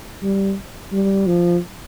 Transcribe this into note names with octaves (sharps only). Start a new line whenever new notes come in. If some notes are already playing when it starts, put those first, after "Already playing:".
G3
G3
F3